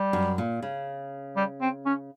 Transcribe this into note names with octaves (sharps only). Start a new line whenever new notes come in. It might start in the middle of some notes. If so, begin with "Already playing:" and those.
Already playing: G3
F#2
A#2
C#3
G3
C4
C#4